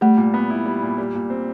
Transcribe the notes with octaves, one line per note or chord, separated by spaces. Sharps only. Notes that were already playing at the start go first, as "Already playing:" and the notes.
G3 A3
A#2
B3
E4
G3
A#2
G3
A#2
C4